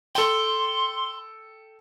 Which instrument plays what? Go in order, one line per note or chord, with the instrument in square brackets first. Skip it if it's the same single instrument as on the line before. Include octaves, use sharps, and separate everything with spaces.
[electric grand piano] A4 G5 [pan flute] C6